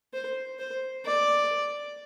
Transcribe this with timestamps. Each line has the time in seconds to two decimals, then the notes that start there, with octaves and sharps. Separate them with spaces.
0.13 C5
0.59 C5
1.06 D5